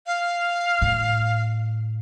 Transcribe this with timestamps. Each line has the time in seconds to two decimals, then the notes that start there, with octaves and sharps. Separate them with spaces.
0.06 F5
0.82 A2